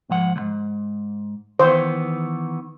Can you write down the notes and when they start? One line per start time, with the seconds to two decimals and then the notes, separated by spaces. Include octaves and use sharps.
0.09 G#2 F3 F#5
0.36 C#2 G#2
1.59 D#3 E3 B3 C5